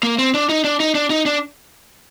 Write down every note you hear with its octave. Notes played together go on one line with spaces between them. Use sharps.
A#3
C4
D4
D#4
D4
D#4
D4
D#4
D4